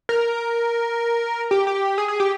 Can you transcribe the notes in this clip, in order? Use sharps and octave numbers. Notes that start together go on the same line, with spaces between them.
A#4
G4
G4
G#4
G#4
G4